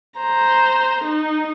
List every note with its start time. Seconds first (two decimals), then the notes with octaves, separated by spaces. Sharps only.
0.19 C5 A#5
1.04 D#4